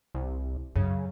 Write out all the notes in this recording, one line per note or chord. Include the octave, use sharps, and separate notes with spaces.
C2
F#2 C#3